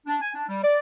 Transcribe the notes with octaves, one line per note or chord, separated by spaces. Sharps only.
D4
G#5
D4
G3
D5